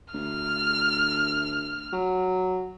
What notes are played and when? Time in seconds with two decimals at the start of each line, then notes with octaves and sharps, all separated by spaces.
0.14 D2 F6
1.93 F#3